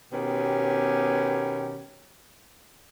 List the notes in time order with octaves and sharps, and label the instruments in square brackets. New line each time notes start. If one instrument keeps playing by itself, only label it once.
[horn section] B2 D#3 B3 C#4 G4